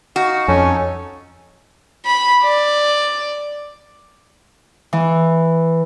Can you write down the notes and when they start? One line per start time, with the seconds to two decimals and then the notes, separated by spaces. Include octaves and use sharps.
0.16 D#4 F#4 F5
0.48 F2 C#4 D#4 A4
2.05 B5
2.43 D5
4.93 E3